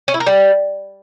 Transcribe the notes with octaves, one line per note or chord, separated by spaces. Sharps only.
C#4
E4
A#4
G3